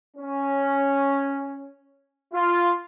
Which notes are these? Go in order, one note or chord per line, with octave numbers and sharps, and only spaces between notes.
C#4
F4